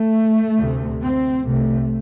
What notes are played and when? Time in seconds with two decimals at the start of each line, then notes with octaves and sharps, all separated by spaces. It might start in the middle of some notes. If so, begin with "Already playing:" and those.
Already playing: A3
0.59 D2 C3
1.02 C4
1.45 C2 C3 A3